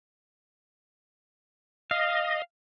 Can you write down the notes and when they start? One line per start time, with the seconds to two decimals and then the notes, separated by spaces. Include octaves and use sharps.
1.91 D#5 F5